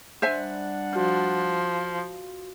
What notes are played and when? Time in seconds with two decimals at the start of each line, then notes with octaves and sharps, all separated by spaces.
0.22 G3 D4 C5 E5 F#5 G#5
0.95 F3 F#4